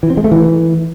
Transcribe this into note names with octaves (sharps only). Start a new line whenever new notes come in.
E3
C4
G#3
A3
E3